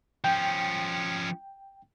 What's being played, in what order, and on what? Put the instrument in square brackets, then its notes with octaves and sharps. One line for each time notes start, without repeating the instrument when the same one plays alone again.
[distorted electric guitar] F3 C#4 [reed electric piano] G5